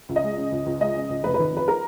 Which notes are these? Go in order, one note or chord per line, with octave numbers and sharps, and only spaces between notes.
C#2
D#5
G#3
C#3
C#2
C#2
G#3 D#5
C#3
C#2
F1 B4
B4
D#3
F2 B4
A#4